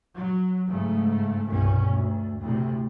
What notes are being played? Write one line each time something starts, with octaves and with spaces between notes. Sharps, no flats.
F#3
G#2 C#3 A3
C2 G2 B2 C#4
D2
D2 A2 C3